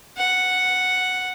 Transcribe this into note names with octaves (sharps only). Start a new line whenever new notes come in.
F#5